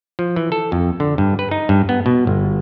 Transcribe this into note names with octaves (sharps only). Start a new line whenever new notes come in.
F3
E3
A4
F2
D3
G2
B4
D#4
G2
B3
B2
G1